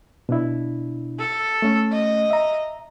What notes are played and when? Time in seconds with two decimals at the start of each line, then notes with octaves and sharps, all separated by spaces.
0.29 B2 D4 E4
1.19 A4
1.62 A3 C#4
1.92 D#5
2.30 E5 A#5